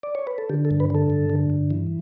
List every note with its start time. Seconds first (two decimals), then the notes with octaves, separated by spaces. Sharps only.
0.03 D5
0.15 C#5
0.27 B4
0.38 A4
0.49 D3 G4
0.65 A4
0.71 G2
0.80 B4
0.90 D3 A4
1.10 G2
1.30 D3
1.50 G2
1.70 E3